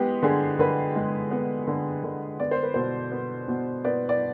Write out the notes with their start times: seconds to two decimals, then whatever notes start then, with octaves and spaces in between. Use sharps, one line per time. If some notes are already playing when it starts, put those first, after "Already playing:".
Already playing: G#3 B3 G4
0.23 D3 G#4
0.59 D3 B4
0.96 G#3
1.31 B3
1.67 D3
2.04 D3
2.40 B3 D5
2.51 C5
2.63 B4
2.74 B2 C5
3.12 B3
3.48 B2
3.84 B3 D5
4.09 D5